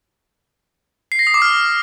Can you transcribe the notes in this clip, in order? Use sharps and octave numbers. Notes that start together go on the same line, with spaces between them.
C7
A#6
D#6
D6
F6